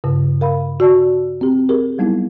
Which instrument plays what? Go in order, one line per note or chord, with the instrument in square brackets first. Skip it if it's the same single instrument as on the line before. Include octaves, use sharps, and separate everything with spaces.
[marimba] G2 C#3
A#4 F5 B5
F#4 D5 A5
C4 G4
G4 G#4 A#4
F#3 G3 B3 D#4 E4